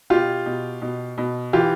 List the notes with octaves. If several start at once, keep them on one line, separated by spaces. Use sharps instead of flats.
B2 F4 G4
B2
B2
B2
E3 F4 G4